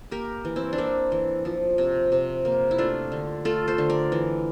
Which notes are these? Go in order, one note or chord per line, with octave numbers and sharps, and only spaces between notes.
A#3 G4 A#4
E3
C4 E4
D4
A#3 C4 E4
E3
F3
C3
C3
A#3
E4
A3 D4 F4
D3
A3 F4 A4
A4 C5
D3
A#4 D5
E3